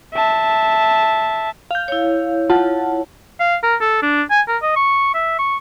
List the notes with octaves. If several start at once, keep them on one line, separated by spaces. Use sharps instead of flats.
E5 A5
F5 G6
E4 C#5
F4 F#5 A5
F5
A#4
A4
D4
G#5
A#4
D#5
C#6
E5
C#6